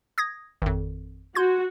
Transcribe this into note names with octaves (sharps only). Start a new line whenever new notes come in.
D#6 G#6 A#6
G#1 F2
F#4 C6 G6 G#6